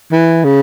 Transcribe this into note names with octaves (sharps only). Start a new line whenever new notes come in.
E3
C#3